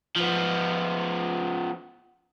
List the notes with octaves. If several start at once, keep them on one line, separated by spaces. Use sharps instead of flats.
F3 B3